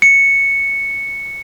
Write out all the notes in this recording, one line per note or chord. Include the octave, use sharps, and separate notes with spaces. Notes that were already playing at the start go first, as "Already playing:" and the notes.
C#7